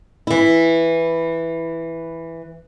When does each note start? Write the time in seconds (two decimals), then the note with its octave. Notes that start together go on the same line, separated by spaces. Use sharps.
0.27 E3 E4